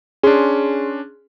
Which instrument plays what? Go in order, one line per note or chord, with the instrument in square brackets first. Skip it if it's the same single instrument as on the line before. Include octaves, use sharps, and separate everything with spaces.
[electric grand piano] C#4 D4 [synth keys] G#4 C6